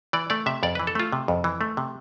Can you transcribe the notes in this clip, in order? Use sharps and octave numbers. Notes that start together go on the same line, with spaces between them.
E3 D5
A3 D5
C3 E5
F2 D5
E3 B4
A4
A3 F4
C3
F2
E3
A3
C3